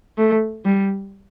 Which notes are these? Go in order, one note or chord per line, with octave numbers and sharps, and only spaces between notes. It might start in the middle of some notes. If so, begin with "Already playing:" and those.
A3
G3